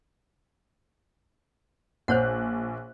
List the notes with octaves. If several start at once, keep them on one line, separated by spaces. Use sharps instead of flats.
A#1 C5 C#5 F#5 F#6